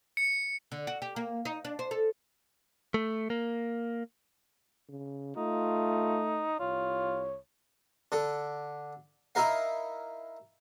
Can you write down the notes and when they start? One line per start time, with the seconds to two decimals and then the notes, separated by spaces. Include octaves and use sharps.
0.17 C#7
0.72 D3
0.87 F#4
1.02 G4
1.16 A#3
1.45 D#4
1.65 D4
1.79 C5
1.91 A4
2.94 A3
3.30 A#3
4.89 C#3
5.37 A3 D#4 F4
6.60 C2 F4 C#5
8.12 D3 A4
9.35 D#4 E4 A#4 F5